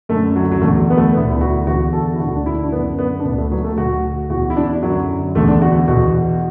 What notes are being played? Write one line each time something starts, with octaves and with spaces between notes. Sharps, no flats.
F#2 D3 A3
F#3
F#3
E2 D3 A3
B3
A3
D2 D3 B3
E4
F#4
E2 D3 F#4
A4
E4
D2 D3 F#4
D4
E4
D4
F#2 D3 B3
B3
D4
D2 D3 B3
A3
F#3
A3
D2 D3 F#4
E2 E3 F#4
E4
D4
F#2 D3 F#3
E2 D3 A3
D4
F#4
E2 B2 F#4